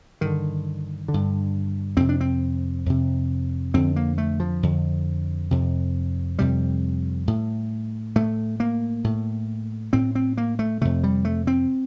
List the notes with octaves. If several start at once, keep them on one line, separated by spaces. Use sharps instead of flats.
G2 D3 D#3
D3
G2
F2 C3 C4
D4
C4
F2 C3
F2 D3 C4
A#3
A3
F3
F2 D3
F2 C3
F2 C3 G3
A2
A2 A3
A#3
A2
A2 C4
C4
A#3
A3
F2 C3 A3
G3
A3
C4